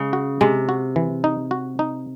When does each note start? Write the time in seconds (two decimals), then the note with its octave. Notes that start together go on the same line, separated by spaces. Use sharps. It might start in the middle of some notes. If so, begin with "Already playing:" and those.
Already playing: C#3 G#3
0.13 F#4
0.41 C3 G#3
0.69 F#4
0.96 E3
1.24 D#4
1.51 F#4
1.79 D#4